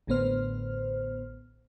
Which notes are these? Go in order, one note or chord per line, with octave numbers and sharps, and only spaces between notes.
A1 A2 D3 B3 C5 F6